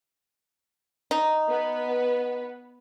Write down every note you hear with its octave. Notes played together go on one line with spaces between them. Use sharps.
D#4
B3 B4